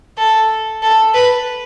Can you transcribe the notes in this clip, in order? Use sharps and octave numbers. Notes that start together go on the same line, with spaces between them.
A4
A4
B4